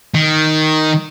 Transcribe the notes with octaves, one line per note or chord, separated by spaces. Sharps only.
D#3